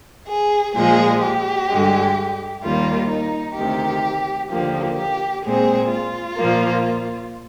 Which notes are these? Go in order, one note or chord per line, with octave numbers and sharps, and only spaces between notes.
G#4
A#2 F3 G#3 G#4
G4
G2 D3 G#3
D#2 D#3 G3 A#3 F4
D#4
D2 C3 D#3 G4
D#2 D3 F3 A#3 G4
G4
A#2 G#3 C4 G#4
F4
A#2 F3 A#3